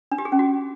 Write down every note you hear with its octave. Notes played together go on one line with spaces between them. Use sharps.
D4
G4
G#4
C#4
F#4